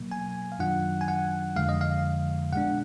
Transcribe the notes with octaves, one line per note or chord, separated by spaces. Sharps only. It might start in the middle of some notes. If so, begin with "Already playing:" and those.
Already playing: B2 F#3 A#3
G#5
F5
F#2 D#3 F#3 D4 F4 F#5
G#5
F#5
F2 D3 F3 G#3 F5
D#5
F5
B2 G#3 D4 F#5